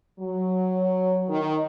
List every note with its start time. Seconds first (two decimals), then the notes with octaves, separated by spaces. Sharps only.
0.20 F#3
1.29 D#3